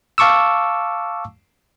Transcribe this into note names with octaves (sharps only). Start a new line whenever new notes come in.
F5 A5 C#6 D6 E6